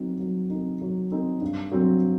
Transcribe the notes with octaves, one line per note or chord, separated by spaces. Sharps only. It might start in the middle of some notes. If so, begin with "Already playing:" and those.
Already playing: F#3 C4 D#4
F#3
C4 D#4
F#3
C4 D#4
G2
F#3 C4